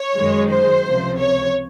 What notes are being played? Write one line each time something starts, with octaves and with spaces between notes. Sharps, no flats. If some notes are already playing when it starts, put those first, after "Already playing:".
Already playing: C#5
F#2 D#3 G#3
C5
C#2 C3 F3
C#5